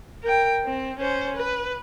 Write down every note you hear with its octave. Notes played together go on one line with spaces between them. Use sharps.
A#4 G5
C4
C#4 C5
B4